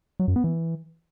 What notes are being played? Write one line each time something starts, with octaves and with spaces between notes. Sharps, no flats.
F#3
F#2
B3
E3